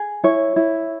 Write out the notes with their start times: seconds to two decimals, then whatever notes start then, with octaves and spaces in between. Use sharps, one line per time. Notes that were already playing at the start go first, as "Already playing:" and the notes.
Already playing: G#4
0.24 E4 C#5
0.56 E4